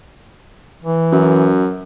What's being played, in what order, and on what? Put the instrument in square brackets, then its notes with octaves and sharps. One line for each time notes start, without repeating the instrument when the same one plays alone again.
[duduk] E3
[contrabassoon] F#2